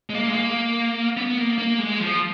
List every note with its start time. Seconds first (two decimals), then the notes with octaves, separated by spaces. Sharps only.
0.10 G#3
0.14 A#3
0.28 G#3
0.35 A#3
1.17 B3
1.38 A#3
1.58 A#3
1.78 G#3
2.00 F3